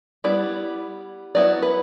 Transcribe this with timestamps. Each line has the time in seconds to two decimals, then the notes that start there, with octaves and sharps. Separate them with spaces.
0.24 G3 B3 E4 D5
1.35 F#3 B3 E4 D5
1.62 B4